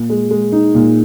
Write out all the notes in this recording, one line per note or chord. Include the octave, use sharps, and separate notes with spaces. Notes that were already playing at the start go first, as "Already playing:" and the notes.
Already playing: A#2
G#3
G#3
D#4
A#2